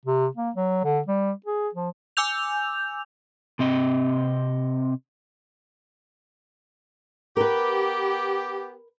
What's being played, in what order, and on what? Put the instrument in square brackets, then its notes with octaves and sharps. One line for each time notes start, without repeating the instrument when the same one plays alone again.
[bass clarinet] C3
A#3
F#3
D3
G3
G#4
F3
[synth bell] G#5 D6 E6 G6 F7
[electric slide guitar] C3 C4 D#5
[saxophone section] B3 G4 [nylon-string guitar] A#4 B4